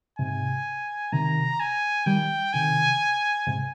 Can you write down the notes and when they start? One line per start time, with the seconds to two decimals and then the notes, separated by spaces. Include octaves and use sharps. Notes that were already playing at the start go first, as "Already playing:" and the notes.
0.19 G#2 C3 G#5
1.13 C3 D#3 A#5
1.60 G#5
2.06 D#3 G3 G5
2.53 C3 D#3 G#5
3.47 G#2 C3